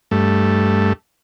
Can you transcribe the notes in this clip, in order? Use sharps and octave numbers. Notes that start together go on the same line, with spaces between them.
G2 A3